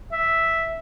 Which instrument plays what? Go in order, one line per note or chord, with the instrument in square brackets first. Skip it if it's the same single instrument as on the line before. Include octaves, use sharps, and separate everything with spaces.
[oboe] E5